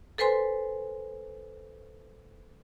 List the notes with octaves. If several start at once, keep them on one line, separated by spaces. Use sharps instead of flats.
A4 B4 C5 G#5 C6